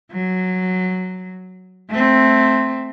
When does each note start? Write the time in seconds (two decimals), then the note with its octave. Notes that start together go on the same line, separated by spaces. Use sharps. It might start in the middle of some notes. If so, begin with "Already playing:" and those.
0.12 F#3
1.90 A3 C4